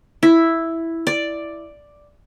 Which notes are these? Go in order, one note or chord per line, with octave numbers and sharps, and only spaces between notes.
E4
D5